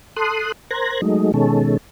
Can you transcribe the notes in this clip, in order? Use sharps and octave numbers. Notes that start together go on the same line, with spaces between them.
A4 C6 D#6 F#6
A#4 C5 F#6 G#6 A#6
F#3 G#3 A3 D#4
B2 D#3 G#3 C#4 A4